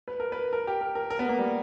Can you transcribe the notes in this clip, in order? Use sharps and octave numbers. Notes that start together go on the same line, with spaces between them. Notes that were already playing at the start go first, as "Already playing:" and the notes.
B4
A#4
B4
A#4
G4
A#4
A#4
A#4
B3
A#3
G3